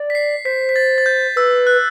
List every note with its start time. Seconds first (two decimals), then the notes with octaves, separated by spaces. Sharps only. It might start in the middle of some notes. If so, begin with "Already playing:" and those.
Already playing: D5
0.10 B6
0.15 C7
0.45 C5 B6
0.69 B6
0.76 A6
0.98 A6
1.06 G6
1.36 B4 E6
1.67 F#6